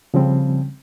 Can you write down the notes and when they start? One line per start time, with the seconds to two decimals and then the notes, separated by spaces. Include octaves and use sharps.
0.14 C#3 F3 G3 C4